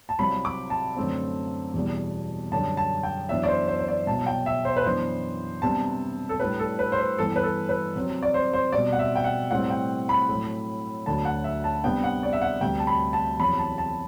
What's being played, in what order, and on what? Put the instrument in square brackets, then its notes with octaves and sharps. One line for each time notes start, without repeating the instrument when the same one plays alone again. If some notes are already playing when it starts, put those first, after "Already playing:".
[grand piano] A5
C2 C3 F#3 B5
D6
A5
F#2 D3 A3 C4
E2 B2 G3
F#2 D3 G3 D4 A5
A5
G5
F#2 E3 B3 D4 E5
D5
C5
C5
C5
D5
C2 B2 F#3 A5
G5
E5
C5
B4
F#2 E3 B3 D4 C5
C3 G3 B3 D4 A5
A4
A2 G3 D4 B4
A4
B4
C5
B4
G2 E3 B3 A4
B4
A4
B4
C3 F#3 C4
D5
C5
C5
B2 G3 C4 D5
F#5
E5
G5
F#5
A2 G3 C4 F#5
G5
B5
A2 F#3 A3
D2 D3 F#3 A5
F#5
E5
A5
C3 G3 B3 D4 G5
F#5
D5
E5
F#5
D2 C3 G3 G5
A5
B5
A5
E2 C3 F#3 B5
A5
A5